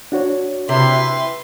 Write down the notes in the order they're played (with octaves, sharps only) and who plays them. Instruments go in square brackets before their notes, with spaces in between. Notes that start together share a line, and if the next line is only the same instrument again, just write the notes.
[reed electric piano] D4 F#4 C#5
[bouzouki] C3 E4 [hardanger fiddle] B4 C6